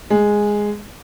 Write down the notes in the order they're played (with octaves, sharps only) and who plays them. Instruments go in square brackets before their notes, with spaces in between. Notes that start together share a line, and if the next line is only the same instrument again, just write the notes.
[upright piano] G#3